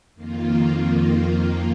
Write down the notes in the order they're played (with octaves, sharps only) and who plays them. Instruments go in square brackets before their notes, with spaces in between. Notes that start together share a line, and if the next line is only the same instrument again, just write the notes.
[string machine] F2 D#3 A#3 F4